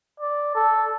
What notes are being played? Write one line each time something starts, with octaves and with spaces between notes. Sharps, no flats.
D5
A4